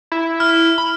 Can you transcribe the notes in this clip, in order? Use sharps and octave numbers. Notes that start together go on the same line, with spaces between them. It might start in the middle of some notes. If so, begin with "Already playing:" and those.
E4
E4 F6
B5